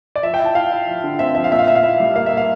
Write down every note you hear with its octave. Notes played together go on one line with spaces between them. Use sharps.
D5
F3 E5
G5
E4 A5
E4 F5
E4
F3
D3
C4 E5
F3 E5
F5
A#2 E5
F5
A#2 E5
F5
E4 E5
G3
A#3 F5
A#3 E5
F5